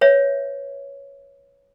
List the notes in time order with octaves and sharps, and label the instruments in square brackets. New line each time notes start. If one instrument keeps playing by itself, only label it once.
[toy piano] B4 C#5 E5